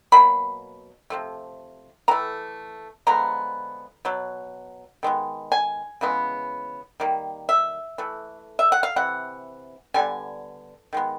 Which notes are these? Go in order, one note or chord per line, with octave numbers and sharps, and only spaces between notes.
B2 F#3 A#3 B5
C3 F3 A3
E3 A3 A#5
D3 F3 G#3 B3 A#5
B2 F#3
D#3 G#3 B3
G#5
C#3 E3 G#3 B3
D#3 G3 A#3
E5
E3 A3
E5
F#5
F5
C3 E3 F#5
D3 G3 B3 G#5
D#3 G#3 B3